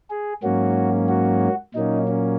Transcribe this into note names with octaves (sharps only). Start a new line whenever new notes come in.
G#4
G#2 F#3 A#3 C#4 F#4
F#4
A#2 F#3 A#3 C#4 D#4
C#4